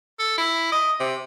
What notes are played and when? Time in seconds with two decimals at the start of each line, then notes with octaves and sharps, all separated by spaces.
0.19 A4
0.37 E4
0.72 D#5
1.00 C3